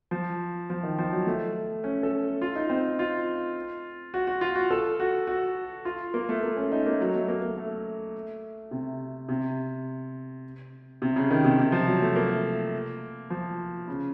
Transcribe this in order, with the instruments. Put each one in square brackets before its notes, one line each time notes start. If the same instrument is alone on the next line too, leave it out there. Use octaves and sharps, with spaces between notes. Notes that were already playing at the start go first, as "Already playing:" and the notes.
[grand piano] F3
F3
D#3
F3
F#3
A3
C#4
A4
F4
D#4
C4
F4
F#4
F#4
F4
F#4
A4
F#4
F#4
F4
A#3
A3
A#3
C#4
D#4
A#3
F#3
A3
A#3
A#3
A3
C3
C3
C3
C#3
D#3
C3
C3
F3
F#3
A3
A#3
F3
C#3